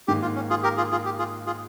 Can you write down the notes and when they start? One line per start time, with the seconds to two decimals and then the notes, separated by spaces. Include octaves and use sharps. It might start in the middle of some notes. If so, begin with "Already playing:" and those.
0.08 G#2 D#3 A#3 G4
0.22 F4
0.35 C#4
0.50 F4 G#4
0.63 G4 A#4
0.77 F4 G#4
0.92 F4 G#4
1.05 G4
1.19 F4 G#4
1.47 F4 G#4